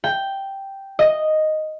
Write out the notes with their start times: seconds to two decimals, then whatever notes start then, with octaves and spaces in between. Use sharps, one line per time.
0.04 G5
0.99 D#5